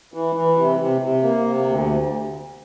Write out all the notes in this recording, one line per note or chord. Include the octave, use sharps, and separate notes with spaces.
E3
E3
C3
C3
C3
A#3
C3
D2